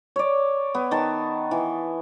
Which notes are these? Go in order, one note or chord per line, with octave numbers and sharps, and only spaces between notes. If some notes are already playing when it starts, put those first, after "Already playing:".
C#5 D5
B3
D#3 A5
E3